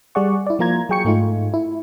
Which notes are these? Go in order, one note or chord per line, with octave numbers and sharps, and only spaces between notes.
G3 G#4 D5 F#5 C#6
E4 D5
F3 A#3 F4 A#5 G#6
F#3 G#4 G5 C#6 C#7
G#2 A3 D#4 F4
E4